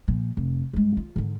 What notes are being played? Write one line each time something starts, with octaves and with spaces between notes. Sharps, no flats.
A#2 F3
F1
G2 G#3
F4
G#2 D3